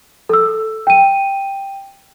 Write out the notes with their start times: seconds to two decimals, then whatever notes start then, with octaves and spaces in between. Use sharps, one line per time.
0.29 A4 E6
0.87 G5 D#7